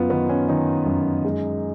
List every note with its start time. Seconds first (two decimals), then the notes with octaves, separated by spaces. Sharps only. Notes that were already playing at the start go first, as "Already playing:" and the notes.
Already playing: F#2 B3 F4
0.10 D#3 B3
0.29 C#4
0.49 D#3 D#4
0.86 F#2
1.24 G#3